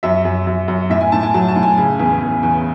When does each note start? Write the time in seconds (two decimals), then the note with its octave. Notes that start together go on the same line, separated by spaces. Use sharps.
0.03 F#2 E5
0.25 F#2
0.47 F#2
0.68 F#2
0.90 A2 E5
1.01 G#5
1.12 A2 A5
1.23 G#5
1.34 F#3 A5
1.48 A5
1.56 A2
1.63 G#5
1.77 C#3 G#5
2.00 E2
2.21 E2
2.43 E2